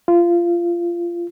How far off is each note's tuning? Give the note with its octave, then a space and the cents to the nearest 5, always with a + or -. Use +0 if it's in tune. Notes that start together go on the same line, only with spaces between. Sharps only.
F4 -20